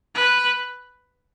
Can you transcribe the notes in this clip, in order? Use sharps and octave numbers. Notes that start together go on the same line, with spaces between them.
B4